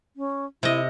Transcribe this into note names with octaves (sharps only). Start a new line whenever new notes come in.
C#4
C3 E4 D#5